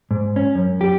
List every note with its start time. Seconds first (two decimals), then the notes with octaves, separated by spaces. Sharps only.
0.11 G#2
0.36 C#4
0.55 F#2
0.81 G4